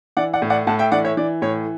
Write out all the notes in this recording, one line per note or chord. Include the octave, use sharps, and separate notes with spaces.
E3 D5 F#5
D5 F#5
A2
D5 F#5
A2 F#5 A5
E5 G5
E3 D5 F#5
C#5 E5
E3 D5
A2 C#5